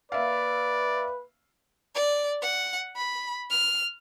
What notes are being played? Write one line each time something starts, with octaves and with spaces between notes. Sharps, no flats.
A#3 B4 D5 E5 F5
D5
F#5
B5
F6